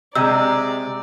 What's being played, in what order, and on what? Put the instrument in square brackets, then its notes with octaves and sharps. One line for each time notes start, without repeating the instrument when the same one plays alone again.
[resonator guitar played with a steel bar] C3 G#3 [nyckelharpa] D5 [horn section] A#5 [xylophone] E6